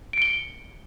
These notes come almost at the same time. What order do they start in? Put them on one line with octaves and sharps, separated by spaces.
D7 C#7 G7